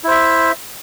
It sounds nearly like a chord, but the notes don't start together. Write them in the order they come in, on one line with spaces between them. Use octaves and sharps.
E4 C5 E5